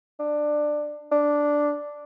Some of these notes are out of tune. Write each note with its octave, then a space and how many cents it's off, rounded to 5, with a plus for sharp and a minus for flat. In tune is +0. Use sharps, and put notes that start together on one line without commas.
D4 +15
D4 +0